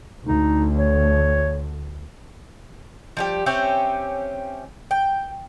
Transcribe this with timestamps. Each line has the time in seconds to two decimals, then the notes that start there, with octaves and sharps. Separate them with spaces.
0.25 D2 D#4
0.77 C#5
3.17 F3 G3 G4
3.46 C4 C#4 G4 E5
4.91 G5